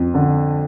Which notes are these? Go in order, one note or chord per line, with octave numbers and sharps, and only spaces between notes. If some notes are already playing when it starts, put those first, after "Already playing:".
Already playing: F2
D3